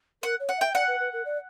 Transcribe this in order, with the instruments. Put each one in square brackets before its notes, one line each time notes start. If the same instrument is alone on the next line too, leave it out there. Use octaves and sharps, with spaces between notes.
[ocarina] A#4 [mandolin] F#5
[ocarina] C#5
[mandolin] F#5
[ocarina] E5 [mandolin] G5
[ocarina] D5 [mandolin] F#5
[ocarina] B4
B4
A#4
D5